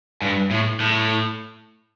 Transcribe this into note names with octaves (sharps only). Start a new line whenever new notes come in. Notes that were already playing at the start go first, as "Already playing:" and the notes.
G2
A2
A2